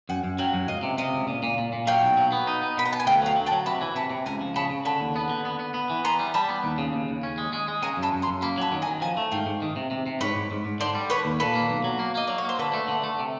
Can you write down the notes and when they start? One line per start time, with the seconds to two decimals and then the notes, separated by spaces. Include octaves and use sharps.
0.09 F#2 F#5 G#5
0.24 F#2
0.38 F#3 F5 G5
0.53 F#2
0.68 C#2 D#5 F5
0.83 C3
0.98 C3 D#5 F5
1.14 C#2
1.28 A#2
1.43 A#2
1.58 A#2
1.73 A#2
1.87 F#3 F5 G5
2.03 B1
2.17 F#3
2.32 B3
2.47 D#4
2.62 B3
2.77 B2 B5
2.85 A#5
2.92 B3 A5
3.00 G#5
3.07 D2 F5 G5
3.22 F#3 F5 G5
3.36 F#3
3.46 G5 A5
3.52 F#3
3.66 C3 A5 B5
3.82 E3
3.95 C3 A5 B5
4.10 C3
4.26 C#2 G#5 A#5
4.41 F3
4.56 C#3 A5 B5
4.70 C#3
4.85 D3 A5 B5
5.00 D#2
5.16 B3
5.30 D3
5.45 B3
5.59 B3
5.74 B3
5.90 E3
6.05 B3 A#5 C6
6.20 G3
6.34 G3 A5 B5
6.49 B3
6.64 D#2
6.78 C#3
6.94 D#2
7.09 D#2
7.23 C#4
7.38 G#3
7.53 G#3
7.68 G#3
7.82 C#3 G#5 A#5
7.97 F#2
8.02 A5 B5
8.13 F#2
8.22 A#5 C6
8.27 F#2
8.42 A#3 A5 B5
8.58 F#3 A5 B5
8.72 D#3
8.82 G#5 A#5
8.87 D#3
9.01 F3 G#5 A#5
9.17 A3
9.32 G#2 F5 G5
9.46 G#2
9.62 D#3
9.76 C3
9.91 C3
10.06 C3
10.21 G#2 B4 C#5
10.35 G#2
10.51 G#2
10.65 G#2
10.80 D3 C5 D5
10.95 G3
11.10 D3 B4 C#5
11.25 D#2
11.40 A#2 A4 B4
11.56 A#3
11.69 B1
11.84 F#3
11.99 A#3
12.15 A#3 D#5
12.27 F#3 D5
12.38 C#5
12.45 A#3 C5
12.59 D3 A4 B4
12.74 A3
12.88 D3
13.04 A3
13.19 C3